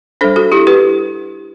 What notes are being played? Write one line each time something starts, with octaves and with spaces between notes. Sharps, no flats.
G3 D4 A4 C5
F#4 A4
E4 G4
G4 B4